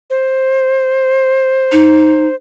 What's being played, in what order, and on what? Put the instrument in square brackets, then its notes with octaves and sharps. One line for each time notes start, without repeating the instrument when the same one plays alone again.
[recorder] C5
[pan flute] D#4